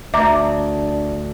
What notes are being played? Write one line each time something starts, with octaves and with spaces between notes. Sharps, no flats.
D2 D4 E5 A#5 D6